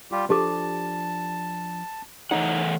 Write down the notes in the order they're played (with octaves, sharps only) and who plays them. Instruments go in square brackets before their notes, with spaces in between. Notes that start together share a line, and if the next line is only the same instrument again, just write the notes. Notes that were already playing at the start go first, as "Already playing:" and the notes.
[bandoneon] G3 F4 G4
[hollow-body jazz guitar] F3 D4 [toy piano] G4 A4 D6 [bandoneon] A5
[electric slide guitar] E3 A3 F#5 [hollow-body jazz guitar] D#4 C#5 D#5